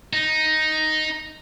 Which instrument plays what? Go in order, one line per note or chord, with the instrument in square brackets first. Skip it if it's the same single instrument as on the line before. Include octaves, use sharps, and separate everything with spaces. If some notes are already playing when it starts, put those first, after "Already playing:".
[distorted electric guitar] D#4